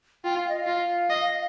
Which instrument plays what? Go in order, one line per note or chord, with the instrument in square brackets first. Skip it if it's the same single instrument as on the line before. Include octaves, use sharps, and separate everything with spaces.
[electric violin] F4 [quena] G5
[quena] F5
D#5
F5
[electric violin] F4
D#5